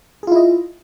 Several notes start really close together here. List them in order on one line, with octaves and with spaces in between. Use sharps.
G#4 F4 E4 D#5